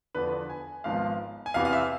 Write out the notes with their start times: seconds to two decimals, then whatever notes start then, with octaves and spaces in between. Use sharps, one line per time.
0.15 E2 D3 F3 B3 B4
0.50 G#5
0.84 G#1 G#2 F3 B3 F5
1.46 G#5
1.54 E2 C3 E3 B3 F5
1.65 F5
1.73 E5